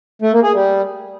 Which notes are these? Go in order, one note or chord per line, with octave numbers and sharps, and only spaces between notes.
A3
A#3
G#4
G3